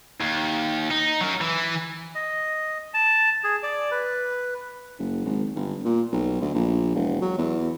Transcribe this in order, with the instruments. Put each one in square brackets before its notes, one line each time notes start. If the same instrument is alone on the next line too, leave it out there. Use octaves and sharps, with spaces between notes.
[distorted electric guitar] D#2
D#4
F#3 A#4
E3
[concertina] D#5
A5
G#4
D5
B4
[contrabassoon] F#1
G#1
G1
A#2
B1
D2
A#1
E1
F#3
E2